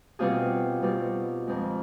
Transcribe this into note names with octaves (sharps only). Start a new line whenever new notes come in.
B2 G3 C4 F4 G#4
B2 G3 C4 D#4
F2 D3 G#3 C4